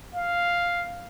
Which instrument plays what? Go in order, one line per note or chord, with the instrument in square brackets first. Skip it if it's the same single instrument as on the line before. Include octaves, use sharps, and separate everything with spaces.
[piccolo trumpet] F5